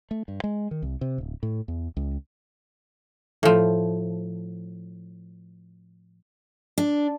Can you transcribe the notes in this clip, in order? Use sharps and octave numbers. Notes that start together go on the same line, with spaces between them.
A3
G2
G#3
D#3
C2
C3
D1
A2
E2
C#2
A2 F3
D4